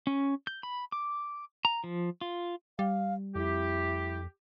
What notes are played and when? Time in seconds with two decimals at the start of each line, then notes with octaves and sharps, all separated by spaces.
0.07 C#4
0.47 G6
0.63 B5
0.92 D6
1.65 A#5
1.84 F3
2.21 F4
2.79 G3 F5
3.35 F2 E4 G4